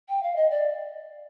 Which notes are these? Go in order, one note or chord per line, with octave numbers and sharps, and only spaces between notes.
G5
F5
D#5
D5